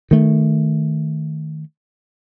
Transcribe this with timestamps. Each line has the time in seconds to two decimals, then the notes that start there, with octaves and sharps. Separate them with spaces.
0.11 D#3 A3